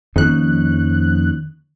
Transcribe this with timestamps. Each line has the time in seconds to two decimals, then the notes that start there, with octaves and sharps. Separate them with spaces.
0.16 F2 D#3 A#3 C#4 D#4 F#6